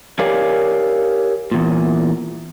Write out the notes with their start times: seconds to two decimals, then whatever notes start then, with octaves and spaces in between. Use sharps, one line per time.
0.19 G4 A#4 C#5 D5 F5 G#5
1.51 E2 A#2